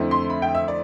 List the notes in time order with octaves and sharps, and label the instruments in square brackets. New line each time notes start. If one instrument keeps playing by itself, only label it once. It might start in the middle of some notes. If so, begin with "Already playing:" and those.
Already playing: [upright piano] F2 D3 A3 C4 E4
C6
B5
G5
E5
D5